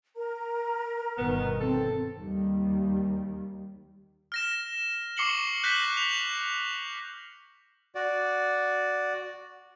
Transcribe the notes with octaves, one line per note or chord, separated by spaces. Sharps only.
A#4 A#5
G1 B2 D#3 B3
C4 A4
D#2 D#3 G3
F6 A#6 E7
C#6 D6 C7 C#7 F#7 G7
F#6 G6 A#6 B6 F#7
F7
F#4 D5